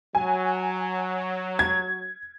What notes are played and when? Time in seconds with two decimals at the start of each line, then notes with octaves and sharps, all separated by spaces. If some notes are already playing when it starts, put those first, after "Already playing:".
0.15 F#3 G#5
1.59 G#6